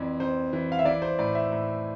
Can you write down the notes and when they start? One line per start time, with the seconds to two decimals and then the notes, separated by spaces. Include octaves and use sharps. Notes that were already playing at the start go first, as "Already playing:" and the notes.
Already playing: F2 E3 D5
0.20 F2 C5
0.53 E3
0.72 F5
0.79 E5
0.85 E3 D5
1.02 C5
1.19 A2 D5
1.35 E5
1.52 A2